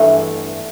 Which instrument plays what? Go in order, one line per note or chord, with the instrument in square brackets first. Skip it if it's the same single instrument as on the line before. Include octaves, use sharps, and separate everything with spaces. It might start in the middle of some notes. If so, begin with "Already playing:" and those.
Already playing: [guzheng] G2 E3 A3 B3